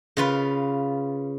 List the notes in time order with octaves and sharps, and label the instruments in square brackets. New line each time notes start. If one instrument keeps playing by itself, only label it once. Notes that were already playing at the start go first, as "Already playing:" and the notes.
[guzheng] C#3 F4 B4